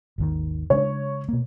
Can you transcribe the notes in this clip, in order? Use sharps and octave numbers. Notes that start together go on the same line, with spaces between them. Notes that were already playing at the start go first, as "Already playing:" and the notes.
G#1 D#2 D#3
C#3 G#3 D4 C#5
B2 A#3